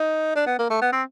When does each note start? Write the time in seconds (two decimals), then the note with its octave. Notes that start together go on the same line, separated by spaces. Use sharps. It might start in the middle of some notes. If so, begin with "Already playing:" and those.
Already playing: D#4
0.36 D4
0.47 B3
0.59 A#3
0.70 A3
0.82 B3
0.93 C4